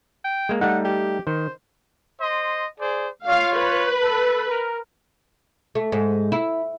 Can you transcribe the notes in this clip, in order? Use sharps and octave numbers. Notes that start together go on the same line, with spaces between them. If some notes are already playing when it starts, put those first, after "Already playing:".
G5
G#3 A#3
G3 A3 D#4 F#5
G4
D#3 C5
C5 D#5 C6
G#4 C5 D5
F4 C#5 F5
B4
A4
A#4
A3
G#2
E4